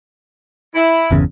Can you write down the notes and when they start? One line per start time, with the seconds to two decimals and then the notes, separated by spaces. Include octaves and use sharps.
0.75 E4
1.11 G1 E2 C#3